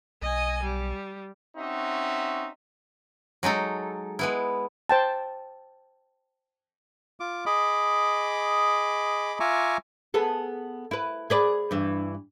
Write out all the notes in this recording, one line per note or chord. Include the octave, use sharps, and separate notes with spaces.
B1 D#5 G#5
G3
C4 C#4 D#4 F#4 E5
F#3 G#3 D#4 A4
G#3 B3 E4
C5 G5 A5
F4 D6
G#4 D#5 B5 D6
F4 E5 G#5 A#5 C#6 D6
B3 G#4 A4
E4 B4
G#4 B4 D5
G2 E3